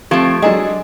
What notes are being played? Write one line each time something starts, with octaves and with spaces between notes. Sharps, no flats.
F3 A3 C4 G4 G#6 C7 D7
F#3 G#3 D4 G#4 A4 D#5 G#5 A#5